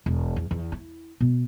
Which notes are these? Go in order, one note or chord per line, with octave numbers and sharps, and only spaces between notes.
E1
E2
E2
E4
B2